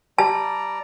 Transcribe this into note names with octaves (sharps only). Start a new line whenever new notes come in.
G3 D5 A5 A#5